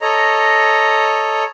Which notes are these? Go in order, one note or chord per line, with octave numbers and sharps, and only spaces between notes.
A4 C#5 D#5 A#5